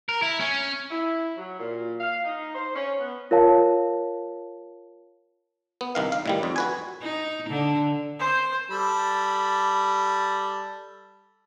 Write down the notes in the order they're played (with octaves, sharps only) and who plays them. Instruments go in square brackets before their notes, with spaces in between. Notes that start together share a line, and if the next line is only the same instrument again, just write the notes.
[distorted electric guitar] A#4
E4
C#4
[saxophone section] E4
F#3
A#2
F5
D#4
C5
C#4
B3
[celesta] F4 A#4 C#5 F5 A5
[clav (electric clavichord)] B3
C2 D#3 F5
F5
A2 D#3 G3
F2
F#4 B4 G#5
[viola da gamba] D#4
D3
[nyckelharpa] C5
[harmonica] G3 A4 B5